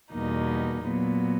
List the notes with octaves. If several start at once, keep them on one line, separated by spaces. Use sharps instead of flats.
E2 B2 G3 A#3 D#4
A#2 F#3 B3